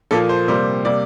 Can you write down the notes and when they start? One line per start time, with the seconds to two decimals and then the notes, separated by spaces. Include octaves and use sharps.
0.11 A#2 F3 A#3 A4
0.29 C5
0.48 C3 G3 A#3 C5
0.85 C3 G3 A#3 D5